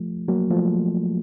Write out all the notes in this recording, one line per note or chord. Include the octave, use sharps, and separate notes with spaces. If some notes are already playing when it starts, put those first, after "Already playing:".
Already playing: F3 A3
F#3 A#3
F3 A3